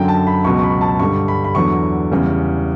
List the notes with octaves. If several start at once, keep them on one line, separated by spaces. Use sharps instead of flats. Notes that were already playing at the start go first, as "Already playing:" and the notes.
Already playing: F#2 D3 F#3 G5
A5
B5
C#2 B2 F#3 C#6
C#6
B5
A5
G2 D3 G3 C#6
B5
B5
E2 D3 F#3 C#6
E2 C#3 E3 G3